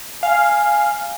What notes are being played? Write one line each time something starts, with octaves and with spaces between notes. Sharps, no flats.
F5 G#5